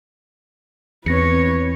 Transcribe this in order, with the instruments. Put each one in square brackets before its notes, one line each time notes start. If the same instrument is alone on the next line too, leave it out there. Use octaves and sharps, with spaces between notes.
[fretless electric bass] E2 [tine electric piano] C4 A#6 C#7 [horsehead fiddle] B4 C#5